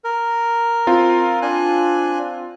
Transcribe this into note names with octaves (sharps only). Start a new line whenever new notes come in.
A#4
C4 F4
D4 G#5 F#6